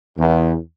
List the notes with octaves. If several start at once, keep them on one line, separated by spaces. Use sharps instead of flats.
E2